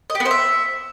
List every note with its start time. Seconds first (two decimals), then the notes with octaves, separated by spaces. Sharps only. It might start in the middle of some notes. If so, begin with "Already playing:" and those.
0.10 D#5
0.15 G4
0.20 B3
0.25 C5
0.31 E5